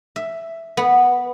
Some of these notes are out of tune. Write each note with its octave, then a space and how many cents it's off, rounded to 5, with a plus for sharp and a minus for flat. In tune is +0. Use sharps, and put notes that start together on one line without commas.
E5 +5
B3 -5